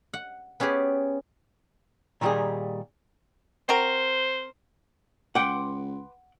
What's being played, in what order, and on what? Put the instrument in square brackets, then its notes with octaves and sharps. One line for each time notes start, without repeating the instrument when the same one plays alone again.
[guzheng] F#5
B3 C#4 G4 G#4 B4
[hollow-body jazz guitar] A#2 D#3 G3 F4 G4 G#4
[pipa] C4 F#4 A#4 [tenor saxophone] C5
[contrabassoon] C#2 [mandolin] B4 C6 D6 [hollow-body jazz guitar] F#5 G5